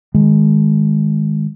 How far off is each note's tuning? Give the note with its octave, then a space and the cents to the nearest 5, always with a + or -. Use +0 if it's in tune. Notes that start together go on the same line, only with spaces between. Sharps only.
D#3 +0 G#3 +0